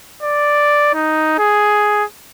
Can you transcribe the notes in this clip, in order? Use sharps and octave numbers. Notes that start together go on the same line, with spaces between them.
D5
D#4
G#4